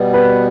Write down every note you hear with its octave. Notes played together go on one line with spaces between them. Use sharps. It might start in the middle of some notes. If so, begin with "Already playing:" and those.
Already playing: B2 G3 B3
B4